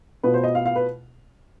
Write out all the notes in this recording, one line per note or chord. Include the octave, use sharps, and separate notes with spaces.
B2 B3 F4 B4
C5
D#5
F5
F5
B4